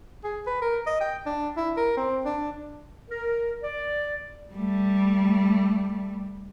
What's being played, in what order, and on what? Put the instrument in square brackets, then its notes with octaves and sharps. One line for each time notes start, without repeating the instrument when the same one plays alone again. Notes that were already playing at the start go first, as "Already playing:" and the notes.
[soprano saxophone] G#4
B4
A#4
D#5
G5
D4
E4
A#4
C4
D4
[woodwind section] A#4
D5
[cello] G3 A3